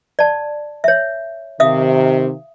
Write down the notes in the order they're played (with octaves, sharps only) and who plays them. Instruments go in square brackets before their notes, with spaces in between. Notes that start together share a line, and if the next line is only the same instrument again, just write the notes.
[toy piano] D5 A5
C#5 E5
[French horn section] C3 D#3 [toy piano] E5 F5 D#6